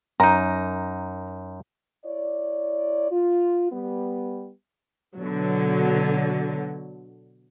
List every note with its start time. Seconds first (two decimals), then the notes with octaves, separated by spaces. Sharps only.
0.20 F#2 D#4 A#5
2.05 E4 C#5 D5
3.11 F4
3.72 G3 B3
5.17 B2 D3 F#3